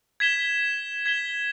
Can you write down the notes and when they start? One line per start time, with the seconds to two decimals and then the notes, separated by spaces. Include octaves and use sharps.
0.20 G#6 B6 E7 G7
1.06 G#6 B6 E7 G7